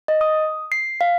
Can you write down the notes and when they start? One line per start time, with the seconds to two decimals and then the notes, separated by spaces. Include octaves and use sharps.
0.08 D#5
0.21 D#6
0.72 C7
1.01 F5